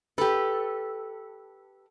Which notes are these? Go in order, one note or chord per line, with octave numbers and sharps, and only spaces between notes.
G4 A4 B4